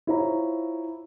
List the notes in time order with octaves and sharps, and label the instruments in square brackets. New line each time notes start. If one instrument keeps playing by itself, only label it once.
[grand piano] E4 F4 C5 C#5 A#5